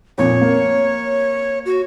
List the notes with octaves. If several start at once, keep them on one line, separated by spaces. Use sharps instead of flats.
F2 A#2 C#5
A#3
F#4